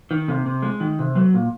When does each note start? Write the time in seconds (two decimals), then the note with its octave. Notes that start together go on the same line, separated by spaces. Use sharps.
0.11 D#3
0.28 C3
0.46 C3
0.62 G#3
0.80 D#3
0.99 C3
1.15 F#3
1.34 A#2